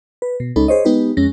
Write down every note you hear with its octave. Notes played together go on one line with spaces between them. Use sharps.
B4
B2
C#2 G#3 C#4 D#4 A4 B5
G#4 C5 C#5 D#5
G#3 B3 D#4 G4 B4
F2 G#3 C#4 A#6